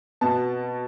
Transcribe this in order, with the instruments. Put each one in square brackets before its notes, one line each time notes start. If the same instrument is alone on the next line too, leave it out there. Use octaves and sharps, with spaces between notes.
[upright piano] B2 B3 A5